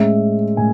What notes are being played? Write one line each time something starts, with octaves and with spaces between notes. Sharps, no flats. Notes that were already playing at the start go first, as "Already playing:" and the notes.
Already playing: A2 G#3 C#4 E5
A2 G#5